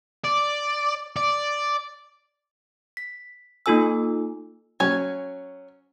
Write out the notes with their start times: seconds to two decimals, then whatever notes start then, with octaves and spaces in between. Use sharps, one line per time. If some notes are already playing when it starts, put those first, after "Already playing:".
0.25 D5
1.16 D5
2.97 B6
3.66 A#3 D#4 F4 A4 G#5 E6
4.80 F#3 C#4 C#5 G#5